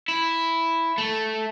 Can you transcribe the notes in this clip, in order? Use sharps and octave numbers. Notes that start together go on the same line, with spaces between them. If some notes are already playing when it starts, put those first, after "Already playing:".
E4
A3